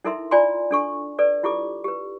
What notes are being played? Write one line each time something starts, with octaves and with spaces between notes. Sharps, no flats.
D#4 E4 A4 A#4 E5 C6
F4 D5 G#5 A#5 C6
D4 A4 C#6
A4 B4 D5
E4 F4 G4 A4 D6
G4 B4